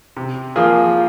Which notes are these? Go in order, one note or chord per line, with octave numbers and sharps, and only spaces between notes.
C3
F3 A#3 F4 G#4